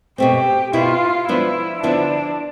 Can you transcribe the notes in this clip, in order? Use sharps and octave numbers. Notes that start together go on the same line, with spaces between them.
B2 A3 C4 G4
B2 B3 E4 F4
F3 B3 D4 E4
D3 F3 B3 D4 E4